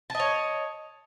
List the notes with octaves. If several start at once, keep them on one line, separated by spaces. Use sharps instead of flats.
C#5 D#5 A5